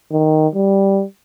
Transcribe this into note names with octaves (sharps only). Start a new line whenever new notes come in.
D#3
G3